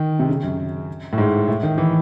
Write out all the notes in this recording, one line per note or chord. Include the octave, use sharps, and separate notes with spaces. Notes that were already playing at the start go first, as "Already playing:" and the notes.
Already playing: D#3
C3
C#3
F#2
A2
G#2
A2
D#3
E3